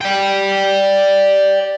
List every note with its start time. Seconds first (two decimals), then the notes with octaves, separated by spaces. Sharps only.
0.01 D5 G5